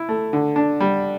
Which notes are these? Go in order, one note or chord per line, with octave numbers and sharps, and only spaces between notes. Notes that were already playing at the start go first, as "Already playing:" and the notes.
Already playing: E4
A3
D3
D4
G3